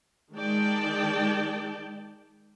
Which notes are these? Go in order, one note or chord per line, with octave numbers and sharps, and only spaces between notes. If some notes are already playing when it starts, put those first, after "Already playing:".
D#3 G#3 D5 G5 A5